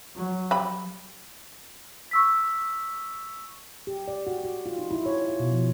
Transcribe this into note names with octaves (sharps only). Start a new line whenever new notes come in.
F#3
G3 B5
C#6 E6 B6
G4
D5
F#4
F#4
F4
D#4
E4
C#5
F4
B2
F3